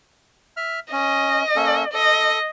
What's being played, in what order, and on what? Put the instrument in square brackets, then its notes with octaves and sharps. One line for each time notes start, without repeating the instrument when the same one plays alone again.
[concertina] E5 F6
[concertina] C#4 [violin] D#5
[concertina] A#3 C#4 A4
[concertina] A4 [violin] D#5